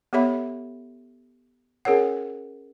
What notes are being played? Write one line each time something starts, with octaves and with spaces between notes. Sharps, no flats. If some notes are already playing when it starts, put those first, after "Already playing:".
B3 G4 A4 C#5 E5 B5
C#4 G#4 A#4 C#5 F#5